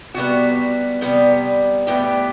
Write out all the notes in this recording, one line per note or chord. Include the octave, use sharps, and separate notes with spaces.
C3 G3 B3 F#4
C3 G3 B3
A2 G3 B3 G4